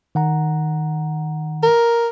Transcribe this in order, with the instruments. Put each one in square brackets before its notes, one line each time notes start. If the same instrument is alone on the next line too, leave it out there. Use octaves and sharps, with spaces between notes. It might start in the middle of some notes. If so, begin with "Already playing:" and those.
[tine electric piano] D#3 F#5 A#5
[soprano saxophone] A#4